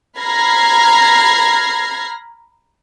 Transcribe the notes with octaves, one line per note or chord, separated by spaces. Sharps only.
A#5 B5 F6 G#6 A#6 C7